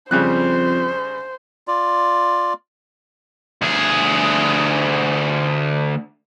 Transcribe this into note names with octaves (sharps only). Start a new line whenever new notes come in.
F2 C#3 G3 C5 F#6
F4 D5
D2 G#4